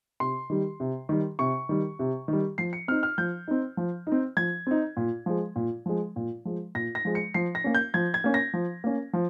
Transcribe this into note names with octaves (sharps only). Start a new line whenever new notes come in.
C3 C6
D#3 G3
C3
D#3 G3
C3 C#6
D#3 G3
C3
D#3 G3
F3 C7
C#7
C4 D#4 F6
F6
F3 G6
C4 D#4
F3
D#4
C4
F3 G#6
C4 D#4
A#2
F3 G#3
A#2
F3 G#3
A#2
F3 G#3
A#2 A#6
A#6
F3 G#3
C#7
F3 C7
A#6
A#3 C#4
G6
F3 G#6
G#6
A#3 C#4
A#6
F3
A#3 C#4
F3